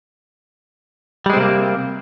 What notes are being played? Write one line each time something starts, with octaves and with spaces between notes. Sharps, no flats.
C3 G3 G#3 A#3 C4